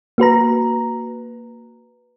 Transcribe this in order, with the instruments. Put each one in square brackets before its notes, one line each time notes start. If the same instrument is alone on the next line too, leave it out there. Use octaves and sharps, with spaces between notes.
[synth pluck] A#3 F#4 B4 A#5